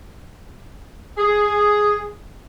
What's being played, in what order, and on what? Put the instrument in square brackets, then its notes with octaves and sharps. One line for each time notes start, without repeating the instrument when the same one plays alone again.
[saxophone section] G#4